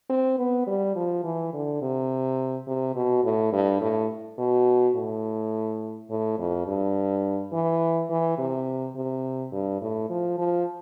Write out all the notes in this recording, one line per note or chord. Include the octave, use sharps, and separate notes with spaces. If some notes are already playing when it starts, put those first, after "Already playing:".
C4
B3
G3
F3
E3
D3
C3
C3
B2
A2
G2
A2
B2
A2
A2
F2
G2
E3
E3
C3
C3
G2
A2
F3
F3